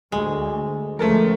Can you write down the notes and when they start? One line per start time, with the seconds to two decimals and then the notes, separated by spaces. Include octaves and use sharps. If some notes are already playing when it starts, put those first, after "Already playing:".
0.12 D2 G#3
0.99 C#2 F3 A3 A4 A#4